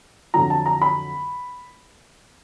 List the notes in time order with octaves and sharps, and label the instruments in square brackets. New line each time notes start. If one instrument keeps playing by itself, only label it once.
[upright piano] F2 D3 F#3 A#5
A5
A#5
B5